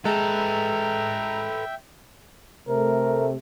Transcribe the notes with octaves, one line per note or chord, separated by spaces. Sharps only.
G#3 A4 B4 E5 G5 A#5
C3 A3 A#4